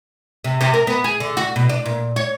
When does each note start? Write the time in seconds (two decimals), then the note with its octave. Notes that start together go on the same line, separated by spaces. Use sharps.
0.44 C3
0.61 C3
0.74 A#4
0.87 B3
1.04 G#4
1.20 D3
1.37 F#4
1.56 B2
1.69 D4
1.86 A#2
2.16 C#5